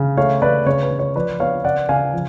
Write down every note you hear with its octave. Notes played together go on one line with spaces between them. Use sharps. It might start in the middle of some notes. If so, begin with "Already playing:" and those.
Already playing: C#3
A3 C#5 F5
C#3 B4 D5
C#3 C#5
B4
C#3
C#5
F3 B4 D5
B3 C#5 F5
C#3 D5 F#5
C#3 F5 G#5
F3